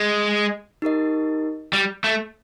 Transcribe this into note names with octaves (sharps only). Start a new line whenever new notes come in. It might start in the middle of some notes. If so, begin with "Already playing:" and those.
Already playing: G#3
D#4 G4 A#4 D#5
G3
A3